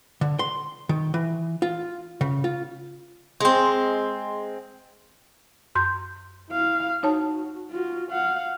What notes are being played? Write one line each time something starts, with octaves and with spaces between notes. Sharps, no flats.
D3
C6
D#3
E3
F4
C#3
F4
G#3 C4
F#2 C6 G6
E4 F5
D#4 F#4 C#5 A5
F4 F#4
F5 F#5